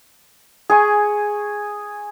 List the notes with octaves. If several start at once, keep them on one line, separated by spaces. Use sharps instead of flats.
G#4 G#5 C#6